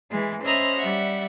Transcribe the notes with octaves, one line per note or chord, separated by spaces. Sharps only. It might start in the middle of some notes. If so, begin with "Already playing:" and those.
E3 G#3
C#4 C5 D#5 E5 A#5 B5
G3 E5 F#5